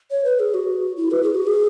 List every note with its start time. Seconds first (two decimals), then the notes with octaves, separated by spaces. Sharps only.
0.11 C#5
0.25 B4
0.40 G#4
0.54 F#4
0.97 E4
1.11 B4
1.23 G#4
1.34 F#4
1.47 G#4